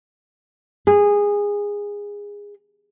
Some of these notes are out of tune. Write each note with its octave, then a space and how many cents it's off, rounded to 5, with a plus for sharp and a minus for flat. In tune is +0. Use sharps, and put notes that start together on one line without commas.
G#4 -20